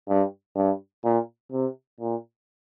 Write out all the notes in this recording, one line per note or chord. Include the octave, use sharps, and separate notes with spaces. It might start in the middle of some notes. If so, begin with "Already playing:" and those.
G2
G2
A#2
C3
A#2